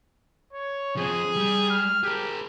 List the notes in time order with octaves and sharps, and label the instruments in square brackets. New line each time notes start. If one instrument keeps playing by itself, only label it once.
[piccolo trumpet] C#5
[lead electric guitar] F3 C4 [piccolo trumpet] G#4
[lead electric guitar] G3
[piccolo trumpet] F6
[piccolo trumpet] G4 [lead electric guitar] G#4 A#4